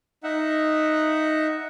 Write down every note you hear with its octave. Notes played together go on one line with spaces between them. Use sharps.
D#4 E5 F#5